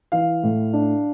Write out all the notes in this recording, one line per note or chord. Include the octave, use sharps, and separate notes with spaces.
E3 F5
A2
D4